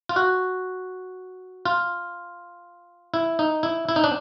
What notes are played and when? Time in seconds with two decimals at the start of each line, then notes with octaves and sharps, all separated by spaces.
0.09 F4
0.16 F#4
1.65 F4
3.14 E4
3.39 D#4
3.63 E4
3.89 E4
3.96 D#4
4.04 D4